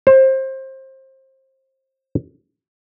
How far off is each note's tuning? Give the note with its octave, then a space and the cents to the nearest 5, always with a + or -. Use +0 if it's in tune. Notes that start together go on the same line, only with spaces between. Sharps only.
C5 +25